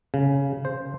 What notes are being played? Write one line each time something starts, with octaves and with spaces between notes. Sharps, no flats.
C#3
C5